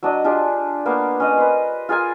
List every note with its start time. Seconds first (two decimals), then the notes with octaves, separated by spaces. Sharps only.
0.03 F#3 D4 D#5
0.24 D4 F4 G4 G#4
0.86 A#3 B3 F5
1.20 C#4 D#5
1.38 B4 C5
1.89 F4 G#4 A#4 G#5